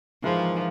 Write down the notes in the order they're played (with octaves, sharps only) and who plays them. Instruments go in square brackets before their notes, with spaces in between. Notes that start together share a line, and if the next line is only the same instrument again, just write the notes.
[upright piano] G#2 E3 G#3 E4 A#4 [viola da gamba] F3